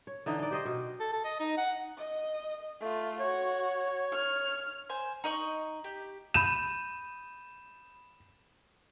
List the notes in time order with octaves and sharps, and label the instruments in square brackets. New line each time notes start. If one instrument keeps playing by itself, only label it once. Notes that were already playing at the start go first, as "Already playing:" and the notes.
[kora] C#5
D3 E3 D#4
D#4 D5
G4 C5 D#5
B2
[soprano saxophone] A4
A4
D#5
D#4
F#5
[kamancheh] D#5
A3 F4
[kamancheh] F#4 [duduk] C#5
[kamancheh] F6
[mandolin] C5 G#5
[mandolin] D#4 D#5 C#6 [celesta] A#5 F#7
[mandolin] G4
[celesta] B5 G6 D#7 [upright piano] E7